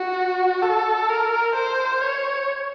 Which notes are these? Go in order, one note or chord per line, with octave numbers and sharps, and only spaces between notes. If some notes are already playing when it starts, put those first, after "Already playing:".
Already playing: F#4
A4
A#4
C5
C#5